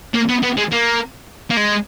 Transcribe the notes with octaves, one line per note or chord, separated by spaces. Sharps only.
A#3
B3
B3
G#3
A#3
A#3
G#3